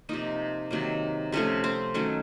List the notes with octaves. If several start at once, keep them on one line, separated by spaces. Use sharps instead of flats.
C3 F3 A#3 D#4
C3 D#3 F#3 A#3
C3 F3 A3 C#4
C4
D#3 F#3 A3 C#4